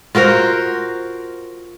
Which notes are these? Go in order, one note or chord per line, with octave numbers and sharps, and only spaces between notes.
F4 F#4 A#4 C5